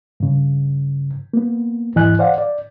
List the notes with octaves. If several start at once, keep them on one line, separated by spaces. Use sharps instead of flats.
G2 C#3
A#3 B3
E2 G#2 E3 D#5 G#5 F#6
C5 D5 F5 F#5
D5